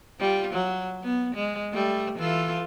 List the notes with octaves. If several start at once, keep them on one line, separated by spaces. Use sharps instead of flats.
G3 F4
F#3
B3
G#3
G3 A3
E3 F4 A4